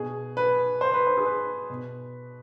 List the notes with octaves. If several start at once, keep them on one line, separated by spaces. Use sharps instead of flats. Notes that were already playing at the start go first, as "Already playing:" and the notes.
Already playing: B2 G#4
B4
C5
B4
C5
G#4
B4
B2